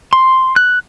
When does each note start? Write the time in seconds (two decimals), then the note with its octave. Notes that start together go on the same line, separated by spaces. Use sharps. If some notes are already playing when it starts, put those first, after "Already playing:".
0.13 C6
0.56 F#6